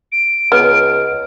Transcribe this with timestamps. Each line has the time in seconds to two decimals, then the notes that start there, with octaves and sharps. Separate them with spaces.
0.12 D7
0.52 C#2 B3 F6